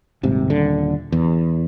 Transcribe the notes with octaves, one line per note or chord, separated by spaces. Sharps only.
D#1 G#1 C3
D#1 D3
E2